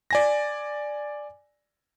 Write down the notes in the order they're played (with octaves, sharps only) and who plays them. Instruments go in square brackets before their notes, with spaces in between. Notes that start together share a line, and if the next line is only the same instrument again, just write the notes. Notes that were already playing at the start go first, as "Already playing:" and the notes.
[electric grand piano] D5 G#5 A#6